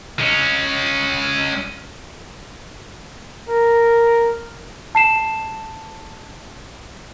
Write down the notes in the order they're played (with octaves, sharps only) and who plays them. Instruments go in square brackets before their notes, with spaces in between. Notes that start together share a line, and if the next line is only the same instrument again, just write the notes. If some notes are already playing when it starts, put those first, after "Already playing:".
[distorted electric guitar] G#3 C#4
[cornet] A#4
[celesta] A5 C7 E7